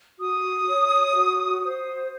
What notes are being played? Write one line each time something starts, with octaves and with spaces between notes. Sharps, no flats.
F#4 D#6
C#5
F#4
C5